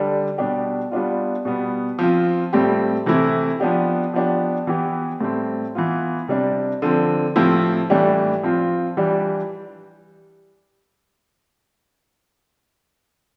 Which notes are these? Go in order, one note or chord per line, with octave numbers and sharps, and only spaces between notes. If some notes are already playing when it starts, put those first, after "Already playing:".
Already playing: D3 G3 D4 G4
B2 G3 D4 G4
G3 B3 D4 F4
B2 G3 B3
F3 C4 F4
A2 G3 C4 G4
C3 E3 A3 E4
F3 B3 D4 G4
F3 B3 D4 G4
E3 B3 E4 G4
A2 G3 C4
E3 B3 F4
C3 G3 D4
D3 F3 C4
A2 F3 C4 E4 G4
A2 E3 G3 D4 G4
F3 C4 F4
E3 G3 D4 G4